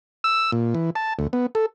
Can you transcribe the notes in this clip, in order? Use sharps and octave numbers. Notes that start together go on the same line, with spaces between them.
E6
A#2
E3
A5
D2
B3
A4